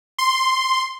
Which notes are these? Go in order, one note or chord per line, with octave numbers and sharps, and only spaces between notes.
C6